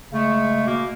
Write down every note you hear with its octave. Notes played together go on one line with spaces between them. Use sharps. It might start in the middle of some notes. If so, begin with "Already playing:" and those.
C#3 G#3 A3
B2 A#3